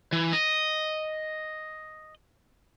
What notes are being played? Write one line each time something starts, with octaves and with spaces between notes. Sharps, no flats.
E3
D#5